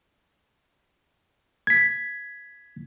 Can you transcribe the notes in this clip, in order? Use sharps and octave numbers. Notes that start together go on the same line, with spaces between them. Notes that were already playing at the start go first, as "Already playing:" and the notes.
G#6 B6